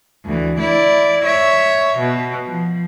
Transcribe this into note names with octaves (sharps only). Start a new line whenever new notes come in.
D2 E3
E4 D5
C#5 E5
B2
F3